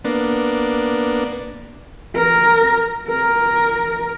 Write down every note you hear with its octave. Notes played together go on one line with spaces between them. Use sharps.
A#3 B3 D4
A#4
A#4